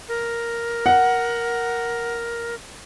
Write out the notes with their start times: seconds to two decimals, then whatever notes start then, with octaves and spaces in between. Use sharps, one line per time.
0.08 A#4
0.86 F#5